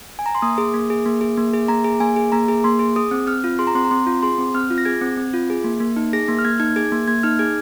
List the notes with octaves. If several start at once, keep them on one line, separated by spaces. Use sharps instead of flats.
G#5
A#5
C6
A#3 D#6
G#4
A#3
G#4
A#3
G#4
A#3
G#4
A#3 A#5
G#4
A#3 G#5
G#4
A#3 A#5
G#4
A#3 C6
G#4
G#4 D#6
C4
C4 F6
F4
G#4 C6
A#5
C4 C6
A#5
C4 C6
F4
G#4 C6
C4
C4 F6
F4
A#6
G#4 G#6
C4
C4
F4
G#4
A#3
A#3
D#4
G#4 A#6
A#3
F6
A#3 G#6
D#4 G#6
G#4 G#6
A#3
A#3 G#6
D#4 F6
G#4 G#6